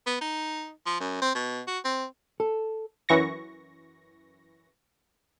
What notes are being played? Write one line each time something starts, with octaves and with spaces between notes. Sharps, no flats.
B3
D#4
F3
F#2
C4
B2
F#4
C4
A4
F#2 E3 C#6 A#6